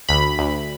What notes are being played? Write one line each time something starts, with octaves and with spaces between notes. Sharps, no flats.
D2 B5
D2